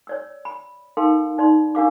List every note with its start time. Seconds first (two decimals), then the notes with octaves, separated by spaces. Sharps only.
0.07 C#5 D5 E6
0.45 B5
0.97 D#4 A4 A#4 F5 G5 C6
1.38 D#4 D5 B5 C6
1.75 D4 G4 A#4 F5 B5 D6